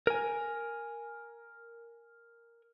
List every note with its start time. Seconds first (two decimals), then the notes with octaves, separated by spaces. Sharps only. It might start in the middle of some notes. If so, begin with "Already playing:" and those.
0.07 A#4 G#5